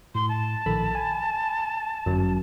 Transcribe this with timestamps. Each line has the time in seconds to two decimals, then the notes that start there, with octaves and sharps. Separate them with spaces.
0.15 A2 C6
0.29 A5
0.66 A#1 D#3 A4 B5
0.95 G#5
2.06 G1 F#2